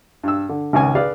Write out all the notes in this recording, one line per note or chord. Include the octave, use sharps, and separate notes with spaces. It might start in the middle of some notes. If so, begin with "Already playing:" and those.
G2 E6
D3
G#1 C#2 C#4 G#5
G#4 B4 D5 F5